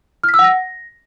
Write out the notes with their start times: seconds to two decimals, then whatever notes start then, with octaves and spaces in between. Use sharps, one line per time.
0.24 F6
0.29 B6
0.34 E6
0.39 F#5
0.44 A#6